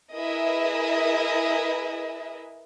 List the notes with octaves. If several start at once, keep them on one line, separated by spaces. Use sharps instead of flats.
E4 G#4 A#4 B4 D#5 E5